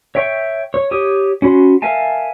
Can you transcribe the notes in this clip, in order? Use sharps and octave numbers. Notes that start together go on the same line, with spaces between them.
C#5 E5 G5 C#6
C#5
G4 C#5 D#6
C#4 F#4 B5 C6
A#4 E5 F5 G#5 A5